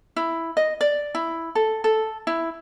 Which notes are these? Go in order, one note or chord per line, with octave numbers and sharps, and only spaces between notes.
E4
D#5
D5
E4
A4
A4
E4